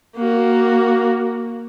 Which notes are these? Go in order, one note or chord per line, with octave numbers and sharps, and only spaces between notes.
A#3 F#4